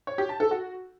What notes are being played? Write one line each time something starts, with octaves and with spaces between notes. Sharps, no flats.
C#5
G4
A5
A4
F#4